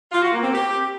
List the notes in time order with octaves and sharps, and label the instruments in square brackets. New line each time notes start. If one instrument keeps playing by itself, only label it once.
[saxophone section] F4
F#4
A#3
C4
G4